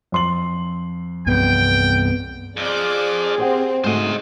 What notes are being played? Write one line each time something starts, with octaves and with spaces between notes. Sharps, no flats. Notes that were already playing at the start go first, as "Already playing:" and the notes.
F2 C6 F#7
C2 G2 B3 C4 G5
F2 F3 G#4 D5 D6
C4 G4 C5 F#5
G#2 C#3 G#3 A3 F#4 C5 D#5